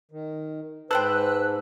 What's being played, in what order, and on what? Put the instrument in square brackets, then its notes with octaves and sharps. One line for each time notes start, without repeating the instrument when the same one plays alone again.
[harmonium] D#3
[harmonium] G#2 [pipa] A4 C5 G5 [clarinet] B4 [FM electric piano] E6 F#6